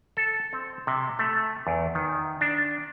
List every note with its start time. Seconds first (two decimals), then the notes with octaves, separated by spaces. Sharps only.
0.17 A4
0.53 C4
0.87 C3
1.19 A3
1.67 E2
1.95 D#3
2.41 D4